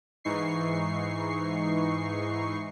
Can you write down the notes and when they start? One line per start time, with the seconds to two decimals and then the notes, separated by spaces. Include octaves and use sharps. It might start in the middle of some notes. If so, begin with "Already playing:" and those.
0.24 G#2 E3 D#4 C#6 C7